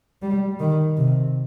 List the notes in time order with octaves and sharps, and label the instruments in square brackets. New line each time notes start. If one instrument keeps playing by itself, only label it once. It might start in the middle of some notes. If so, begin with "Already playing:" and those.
[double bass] G3
D#3
C3